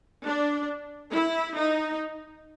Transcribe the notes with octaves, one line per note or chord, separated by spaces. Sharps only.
D4
E4
D#4